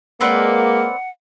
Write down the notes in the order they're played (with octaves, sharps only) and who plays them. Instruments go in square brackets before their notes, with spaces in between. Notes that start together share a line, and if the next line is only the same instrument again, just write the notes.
[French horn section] G#3 A#3 [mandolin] C4 B4 D5 [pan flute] F#5